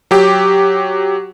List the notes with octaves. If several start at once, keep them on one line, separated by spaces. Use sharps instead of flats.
F#3 G4